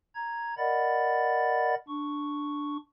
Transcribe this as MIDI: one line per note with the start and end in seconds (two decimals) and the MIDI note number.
0.15 0.54 82
0.15 0.54 92
0.58 1.75 70
0.58 1.75 74
0.58 1.75 75
0.58 1.75 78
0.58 1.75 83
0.58 1.75 93
1.88 2.77 62
1.88 2.77 85